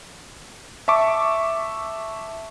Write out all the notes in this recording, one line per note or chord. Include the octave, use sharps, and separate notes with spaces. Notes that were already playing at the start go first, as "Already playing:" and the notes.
E5 A5 C#6 D6